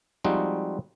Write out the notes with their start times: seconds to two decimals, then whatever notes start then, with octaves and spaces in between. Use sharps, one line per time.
0.24 F3 G3 G#3 C4 D#4 F#4